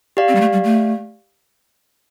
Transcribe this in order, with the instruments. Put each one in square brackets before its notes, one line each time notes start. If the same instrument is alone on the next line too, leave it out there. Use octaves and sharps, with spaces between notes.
[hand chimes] G4 D5 F5
[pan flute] C4
G3
A3
G3
A3